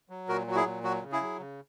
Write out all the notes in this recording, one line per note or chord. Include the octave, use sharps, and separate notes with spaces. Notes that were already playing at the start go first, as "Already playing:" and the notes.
F#3
A#2 F#4 A#4
F#3 F#4
E4 G#4
A#2
F#3 F#4
C#3
E4 G#4
F#3
C#3